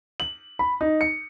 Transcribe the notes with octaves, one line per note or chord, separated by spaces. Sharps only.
F#7
B5
D#4
C#7